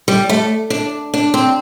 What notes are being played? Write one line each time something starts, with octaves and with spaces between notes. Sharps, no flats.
G3
A3
D4
D4
C4